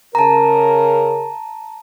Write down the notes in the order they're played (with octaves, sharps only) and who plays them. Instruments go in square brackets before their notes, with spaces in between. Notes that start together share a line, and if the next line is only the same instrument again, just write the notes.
[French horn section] C#3 A#4 [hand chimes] A5 A#5